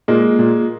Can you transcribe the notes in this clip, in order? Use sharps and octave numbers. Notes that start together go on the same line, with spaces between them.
A#2 G#3 A#3
A#2